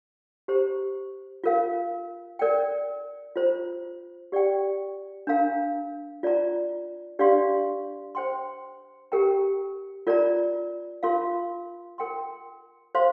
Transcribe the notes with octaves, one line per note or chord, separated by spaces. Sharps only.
G4 C5 A#5
F4 A#4 F5
A#4 D5 G5
F4 C5 A#5
G4 D5 G5
D4 A#4 F5 A#5
F4 D5 A#5
D4 G4 D5 F5 C6
C5 G5 C6
G4 A#4 G5 A#5
F4 A#4 D5 A#5
F4 A#4 F5 C6
A#4 G5 C6
C5 F5 C6